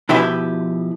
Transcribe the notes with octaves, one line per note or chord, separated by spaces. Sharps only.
B2 F3 E4 G4 B4 E5